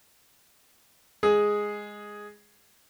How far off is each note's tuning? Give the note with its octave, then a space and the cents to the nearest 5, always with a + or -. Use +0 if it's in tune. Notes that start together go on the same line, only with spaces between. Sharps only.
G#3 +0 G#4 +0